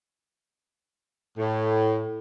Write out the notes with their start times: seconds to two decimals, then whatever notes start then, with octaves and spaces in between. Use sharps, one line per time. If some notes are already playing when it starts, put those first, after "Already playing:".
1.38 A2